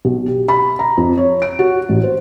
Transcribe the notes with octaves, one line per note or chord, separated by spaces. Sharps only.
B1
G4
B5
A#5
F2
C#5
D7
F#4
A1
C5